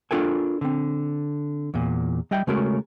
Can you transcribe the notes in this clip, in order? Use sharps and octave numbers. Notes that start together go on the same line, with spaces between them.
D4 F4 A4 A#4 G5 G#5
D3 C4
E2 A#2
G3 D#5 E5 G5
C#3 G#3 A3 C#4 F#4 A#4